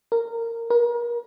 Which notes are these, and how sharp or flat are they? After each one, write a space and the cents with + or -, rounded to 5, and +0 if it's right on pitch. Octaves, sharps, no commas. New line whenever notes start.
A#4 -15
A#4 +35